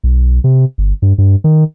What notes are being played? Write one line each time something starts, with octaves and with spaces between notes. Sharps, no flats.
B1
C3
G1
G2
G2
D#3